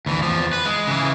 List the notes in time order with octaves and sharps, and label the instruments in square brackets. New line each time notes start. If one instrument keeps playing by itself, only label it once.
[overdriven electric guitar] D2 E3
E2 F3
B4
G#3
C#3 E3